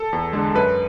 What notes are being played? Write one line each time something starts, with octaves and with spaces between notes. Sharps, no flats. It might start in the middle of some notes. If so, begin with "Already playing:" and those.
Already playing: A4
E2
D3 G#3
F#2 B4